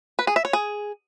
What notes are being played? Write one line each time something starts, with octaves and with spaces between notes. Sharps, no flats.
B4
G#4
E5
C#5
G#4